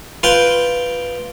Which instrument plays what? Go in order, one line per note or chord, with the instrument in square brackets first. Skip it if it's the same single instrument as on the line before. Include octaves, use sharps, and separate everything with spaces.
[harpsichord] F4 B4 G5